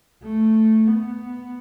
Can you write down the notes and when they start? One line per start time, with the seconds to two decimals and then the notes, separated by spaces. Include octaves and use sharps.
0.23 A3
0.87 B3